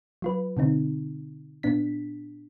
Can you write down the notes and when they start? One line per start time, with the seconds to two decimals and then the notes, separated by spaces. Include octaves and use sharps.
0.22 F#3 F4 B4
0.57 B2 D3 C4 D#4
1.63 A#2 B3 D4 B6